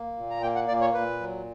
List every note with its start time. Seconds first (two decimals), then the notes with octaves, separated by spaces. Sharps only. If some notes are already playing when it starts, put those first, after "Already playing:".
Already playing: A#3
0.17 A#2
0.31 A#5
0.42 A#3 G5
0.55 F#5
0.68 A#2 D5
0.81 C#5
0.94 A#2 B4
1.20 F#3